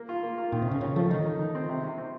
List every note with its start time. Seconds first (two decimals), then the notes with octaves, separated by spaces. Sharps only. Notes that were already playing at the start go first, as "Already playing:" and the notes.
Already playing: A#3
0.09 F4
0.23 A#3
0.38 F4
0.52 A#2 D#3
0.62 C3
0.67 C#3 C#4
0.81 C#3 C#4
0.96 F3 A3
1.10 D#3 D#4
1.25 D#4
1.39 D#4
1.55 C4
1.69 C3
1.84 C3
1.98 C4